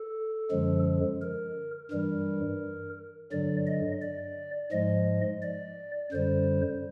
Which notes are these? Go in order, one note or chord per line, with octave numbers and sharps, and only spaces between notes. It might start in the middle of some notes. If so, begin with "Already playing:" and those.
Already playing: A4
F#2 D3 F3 G#3
A#4
G2 E3 G3 A#4
G2 D3 F#3 D5
D#5
D5
G#2 F3 G#3 D#5
D5
F#2 D3 G3 C5